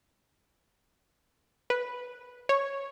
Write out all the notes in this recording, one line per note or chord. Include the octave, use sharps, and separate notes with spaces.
B4
C#5